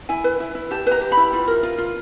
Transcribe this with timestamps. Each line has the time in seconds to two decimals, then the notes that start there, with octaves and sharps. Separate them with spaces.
0.09 E4 G#5
0.24 B4
0.40 E4
0.55 E4
0.71 G4 A5
0.86 B4 A#5
1.01 G4
1.12 B5
1.17 E4
1.33 F4
1.48 A#4
1.63 F4
1.78 F4